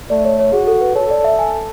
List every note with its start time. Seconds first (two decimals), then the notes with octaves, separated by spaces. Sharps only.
0.10 A3 D5
0.25 C#5
0.39 C#5
0.53 F#4 G#4
0.67 A4
0.81 B4
0.95 A4 C#5
1.10 D5
1.24 E5
1.39 G#5